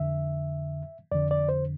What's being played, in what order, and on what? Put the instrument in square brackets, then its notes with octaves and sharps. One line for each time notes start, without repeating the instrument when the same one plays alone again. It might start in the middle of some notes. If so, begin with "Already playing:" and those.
Already playing: [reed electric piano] F2 D3 E5
F2 D3 D5
D5
C5